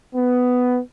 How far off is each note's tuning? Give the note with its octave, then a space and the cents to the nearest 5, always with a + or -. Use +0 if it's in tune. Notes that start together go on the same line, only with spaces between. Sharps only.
B3 +10